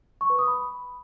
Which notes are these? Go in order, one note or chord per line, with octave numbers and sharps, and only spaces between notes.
C#6
B4
D#6
B5